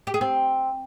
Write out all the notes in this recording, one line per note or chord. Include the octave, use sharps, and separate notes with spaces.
G4
G#4
C4